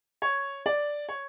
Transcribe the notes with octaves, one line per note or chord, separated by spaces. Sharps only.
C#5
D5
C#5